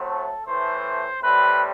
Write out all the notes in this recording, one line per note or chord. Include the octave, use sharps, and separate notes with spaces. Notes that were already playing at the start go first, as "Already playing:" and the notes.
Already playing: A2 F#3 A3 C4
A4
A2 E3 A3 C5
A2 G3 C4 B4